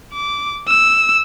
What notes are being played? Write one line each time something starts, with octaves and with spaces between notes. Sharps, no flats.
D6
E6